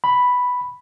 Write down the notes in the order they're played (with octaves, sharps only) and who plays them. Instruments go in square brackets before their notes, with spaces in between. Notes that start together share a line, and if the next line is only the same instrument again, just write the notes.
[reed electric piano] B5